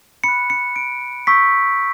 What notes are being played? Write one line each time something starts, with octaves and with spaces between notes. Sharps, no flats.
B5 F#6 C#7
C#7
D7
C#6 E6 G6 B6